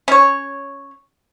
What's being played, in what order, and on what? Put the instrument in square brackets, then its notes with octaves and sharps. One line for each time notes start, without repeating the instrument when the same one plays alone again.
[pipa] C#4 C#5